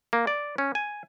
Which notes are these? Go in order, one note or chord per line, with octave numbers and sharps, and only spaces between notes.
A#3
D5
C#4
G#5